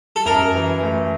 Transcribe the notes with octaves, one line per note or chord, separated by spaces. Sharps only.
A4
F#2 A#4
E3
A3